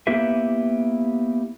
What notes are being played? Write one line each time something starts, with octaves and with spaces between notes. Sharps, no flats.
A#3 B3 E4 G4 B4 E5